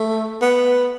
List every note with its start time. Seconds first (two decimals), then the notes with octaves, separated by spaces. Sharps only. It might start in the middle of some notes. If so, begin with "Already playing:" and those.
Already playing: A3
0.41 B3